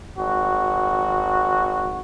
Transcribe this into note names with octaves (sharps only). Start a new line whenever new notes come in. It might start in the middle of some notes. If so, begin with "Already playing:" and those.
G#1 F#4